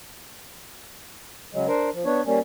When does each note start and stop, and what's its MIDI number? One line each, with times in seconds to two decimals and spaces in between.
1.54 1.67 49
1.54 1.67 54
1.54 1.67 56
1.68 1.90 62
1.68 1.90 70
1.68 1.90 72
1.94 2.04 53
2.05 2.21 59
2.05 2.21 62
2.05 2.21 73
2.25 2.39 55
2.25 2.39 58
2.25 2.39 61